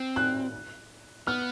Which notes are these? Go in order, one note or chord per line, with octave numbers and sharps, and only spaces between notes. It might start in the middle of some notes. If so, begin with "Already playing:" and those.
Already playing: C4
F#6
B3 F6